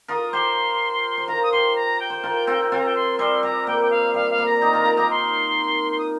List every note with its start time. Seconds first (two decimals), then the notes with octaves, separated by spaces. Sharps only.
0.08 F4 A#4 D#6
0.33 G4 C5 C6
1.18 C5
1.28 F4 A#4 A#5
1.43 D#6
1.52 G4 C5 C6
1.76 A#5
2.00 G5
2.10 C5
2.24 F4 A#4
2.47 C4 F4
2.72 C4 F4 G5
2.78 A#5
2.86 G5
2.95 C6
3.19 G3 C4 C6
3.43 G3 A#5
3.67 A#3 G5
3.82 G5
3.91 F5
4.14 G3 F5
4.30 F5
4.38 A#3
4.46 A#5
4.62 D#4 G4
4.73 F4 A#4
4.85 F4 A#4
4.97 D#4 G4
5.10 C6
5.91 C6
5.98 D#6